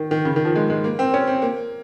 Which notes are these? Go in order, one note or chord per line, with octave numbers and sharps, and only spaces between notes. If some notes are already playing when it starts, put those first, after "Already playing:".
Already playing: D#3
D#3
C#3
D#3
F3
G#3
G#3
A#3
C4
C#4
C4
A#3